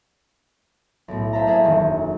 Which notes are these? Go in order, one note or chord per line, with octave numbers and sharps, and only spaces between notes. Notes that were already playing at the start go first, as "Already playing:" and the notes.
B1 A2
C5 E5 F5 A5 A#5
A#3 D4 G#4 A4 C5 E5
E1 F#2 D#3